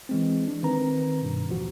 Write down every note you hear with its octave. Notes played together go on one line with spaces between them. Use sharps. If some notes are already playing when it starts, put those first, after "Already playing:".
E3 G#3 C4
D4
D#3 C4 B4 A#5
G2 B2
A1 D#2 F3 F#4